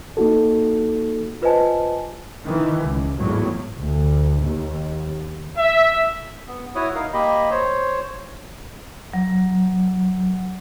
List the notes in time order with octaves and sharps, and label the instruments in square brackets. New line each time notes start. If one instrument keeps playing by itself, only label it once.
[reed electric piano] A#3 D#4 F#4 A4
[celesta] F4 B4 C5 D#5 G#5 A5
[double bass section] D#3 E3
C#2
G#1 E2 A2 F#3
D2
D#2
[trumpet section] E5
[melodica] B3
E4 F#4 C#5 D#6
D#4 A#4 F5
A#3 G4 D#5 B5
C5 C#5
[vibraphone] F#3